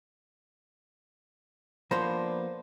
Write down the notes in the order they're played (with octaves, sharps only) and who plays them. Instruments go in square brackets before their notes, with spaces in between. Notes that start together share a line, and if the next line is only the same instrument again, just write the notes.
[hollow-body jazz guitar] F3 A#3 B3 [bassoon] D4 [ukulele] C5 [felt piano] B5 C6 A#6